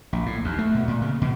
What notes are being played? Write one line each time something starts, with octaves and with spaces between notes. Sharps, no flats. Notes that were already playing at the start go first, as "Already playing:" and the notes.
A#1
A2
D#2
A3
B2
A#2
C#3
B2